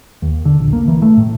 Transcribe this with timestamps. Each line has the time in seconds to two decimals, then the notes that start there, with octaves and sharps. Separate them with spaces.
0.22 D#2
0.45 D3
0.59 A#1
0.73 A#3
0.88 E3
1.02 A3
1.17 A2